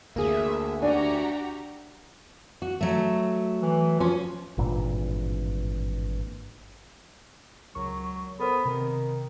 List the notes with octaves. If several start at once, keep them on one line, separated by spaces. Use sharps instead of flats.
D2 A#3 G#4 E5
D4 F#4 G4 G#5 A#5
F#4
F#3 A3
E3
F3 C#4 F4
G#1 G2 A#2 E3
C#2 F#3 A#4 C#6
B3 A4 A#4 C5
C3 D#3